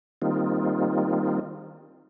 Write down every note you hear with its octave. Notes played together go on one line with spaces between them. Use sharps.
D#3 G3 A#3 C4 D#4 F4